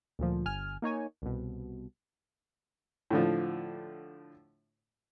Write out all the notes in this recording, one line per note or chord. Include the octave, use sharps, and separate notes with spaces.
D2 A#2 F3
G1 G#5 F6
A#3 D#4 C#5 G#5
C2 B2
A2 D3 F3